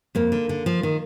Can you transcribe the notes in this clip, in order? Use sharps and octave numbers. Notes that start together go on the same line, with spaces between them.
F2 A#3
D3
D3
F3
D#3